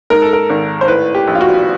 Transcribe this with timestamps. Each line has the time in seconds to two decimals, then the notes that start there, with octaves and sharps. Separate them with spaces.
0.10 G#2 A#4
0.22 A4
0.33 A#4
0.50 G#1
0.81 C5
0.88 A2 B4
1.15 G4
1.28 A#1
1.35 F4
1.41 F#4